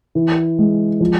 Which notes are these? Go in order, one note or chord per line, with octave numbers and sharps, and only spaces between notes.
E3
G#3
F3